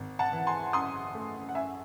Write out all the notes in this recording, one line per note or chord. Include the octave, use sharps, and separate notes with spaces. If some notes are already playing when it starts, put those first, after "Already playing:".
Already playing: G#1
F#5 A5
E3
G#5 C6
F#2 C6 D#6
A3
F#5
F#2 E5 G#5